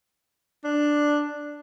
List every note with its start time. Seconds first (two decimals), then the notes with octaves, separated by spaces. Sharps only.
0.64 D4